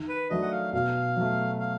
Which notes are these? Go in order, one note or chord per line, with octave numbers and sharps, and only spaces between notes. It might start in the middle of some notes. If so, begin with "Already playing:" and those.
Already playing: D#3
B4
F#3 A3 D4 F#4 D#5
F#5
F5
B2 F5
F#3 A3
F5